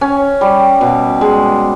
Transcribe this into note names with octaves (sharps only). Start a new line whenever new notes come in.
C#4
G3
B2
G#3